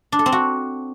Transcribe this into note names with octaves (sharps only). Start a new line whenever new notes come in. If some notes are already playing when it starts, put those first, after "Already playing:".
D4
A4
C4
F#4